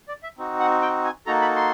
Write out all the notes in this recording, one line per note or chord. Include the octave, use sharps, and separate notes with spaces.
D5
E5
C4 D#4 F#4
F#5
G5
G#5
A#3 D#4 F#4 A4 A#5
B5
C6